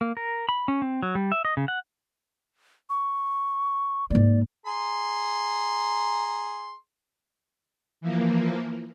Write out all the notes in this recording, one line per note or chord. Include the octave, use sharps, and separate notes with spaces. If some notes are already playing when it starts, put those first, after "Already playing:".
A#3
A#4
B5
C#4
C4
F#3
G3
E5
D#5
C#3
F#5
C#6
G#2 A#3 D5
G#4 A#5 C6
E3 F3 A#3